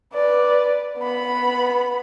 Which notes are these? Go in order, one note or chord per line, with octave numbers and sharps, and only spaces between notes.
B4 D5
B3 B5